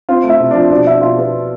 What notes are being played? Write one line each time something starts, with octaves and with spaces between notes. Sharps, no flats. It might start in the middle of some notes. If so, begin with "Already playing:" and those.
C4 F4
A3
E4
C3
F3 D4
B2 D4
D4 E4
B2 F4
B3 G4